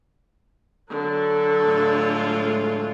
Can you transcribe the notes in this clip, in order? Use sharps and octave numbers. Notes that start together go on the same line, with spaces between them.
D3 F#3 A4
A2 G#3 F4